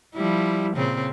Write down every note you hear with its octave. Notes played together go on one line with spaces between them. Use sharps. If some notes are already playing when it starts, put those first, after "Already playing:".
F3 G3 E4
A#2 C#3 C4